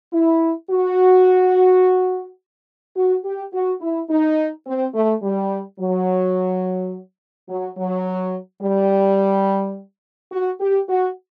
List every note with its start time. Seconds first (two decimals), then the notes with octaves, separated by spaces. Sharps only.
0.13 E4
0.70 F#4
2.97 F#4
3.24 G4
3.53 F#4
3.81 E4
4.09 D#4
4.66 C4
4.94 A3
5.23 G3
5.79 F#3
7.49 F#3
7.78 F#3
8.62 G3
10.32 F#4
10.60 G4
10.89 F#4